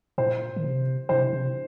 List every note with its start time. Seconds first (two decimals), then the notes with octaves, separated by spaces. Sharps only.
0.18 A#2 C5
0.56 D#3
0.64 C3
1.09 C3 C5
1.33 C3